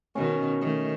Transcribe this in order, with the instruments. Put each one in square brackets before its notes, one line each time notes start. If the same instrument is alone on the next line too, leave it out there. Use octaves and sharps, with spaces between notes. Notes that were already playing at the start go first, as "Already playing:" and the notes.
[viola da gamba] B2 D#3 [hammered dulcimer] C#4
[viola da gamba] D#3 A3